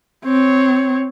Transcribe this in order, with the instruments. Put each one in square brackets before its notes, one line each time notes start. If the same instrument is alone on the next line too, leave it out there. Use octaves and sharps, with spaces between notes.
[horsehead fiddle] C4 C#5